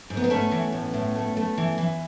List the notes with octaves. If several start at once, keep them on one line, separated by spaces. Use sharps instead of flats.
G#2
B3
C4
A3 B3 C#4
E3
A2
A2
A3
A3
E3
E3